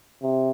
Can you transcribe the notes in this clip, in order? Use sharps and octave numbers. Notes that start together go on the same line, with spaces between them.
C3